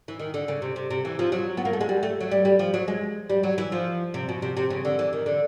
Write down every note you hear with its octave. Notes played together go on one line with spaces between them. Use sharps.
E3
D#3
D3
C#3
C3
C3
C3
E3
F3
F#3
B3
A#3
A3
G#3
G3
A3
F#3
G3
G3
F3
F#3
G#3
G3
F#3
E3
F3
C3
B2
C3
C3
C#3
D3
E3
D#3
D3